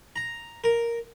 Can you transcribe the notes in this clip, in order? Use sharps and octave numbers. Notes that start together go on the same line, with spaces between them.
A#5
A#4